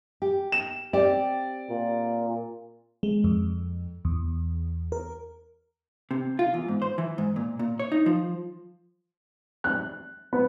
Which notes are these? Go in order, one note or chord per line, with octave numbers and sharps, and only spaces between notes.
G4
E7
C4 G4 D5
A#2
G#3
F2
E2
A#4
C3
F4
E2
G#2
C5
E3
G#2
A#2
A#2
C#5
D#4
F3
F#6
B3